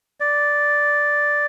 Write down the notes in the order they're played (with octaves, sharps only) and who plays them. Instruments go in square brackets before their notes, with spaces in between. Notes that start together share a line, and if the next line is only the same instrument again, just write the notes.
[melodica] D5